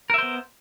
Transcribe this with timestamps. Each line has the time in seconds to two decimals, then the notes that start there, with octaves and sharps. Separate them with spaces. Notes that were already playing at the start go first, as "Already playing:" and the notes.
0.10 A#4
0.14 E5
0.18 C5
0.23 B3